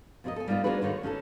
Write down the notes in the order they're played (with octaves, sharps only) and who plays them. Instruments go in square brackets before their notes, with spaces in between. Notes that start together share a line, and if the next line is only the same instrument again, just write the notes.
[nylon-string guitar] F2 C4 E4 G#4 A#4 D#5
A4 G#5
G3 A#3 B3 D#4 F4
A#3 C4 D4 F#4 G#4 B4
D3 D#3 D#4 C#5
C#4 D#4 G#4 A4